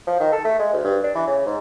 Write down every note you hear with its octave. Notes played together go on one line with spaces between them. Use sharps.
F3
D#3
A4
A3
G#3
D2
G2
D4
E3
C#3
G#2